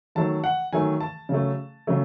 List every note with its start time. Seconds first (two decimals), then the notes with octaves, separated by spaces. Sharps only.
0.15 D#3 F#3 A3 A5
0.44 F#5
0.73 D#3 F#3 A3 G#5
1.00 A5
1.29 C#3 F#3 A3
1.87 C#3 F#3 A3